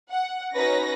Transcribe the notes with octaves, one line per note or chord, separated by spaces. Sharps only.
F#5
C#4 D#4 F#4 B4 A#6